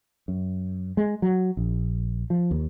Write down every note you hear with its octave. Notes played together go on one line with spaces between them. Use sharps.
F#2
G#3
F#3
A#1
F3
D#2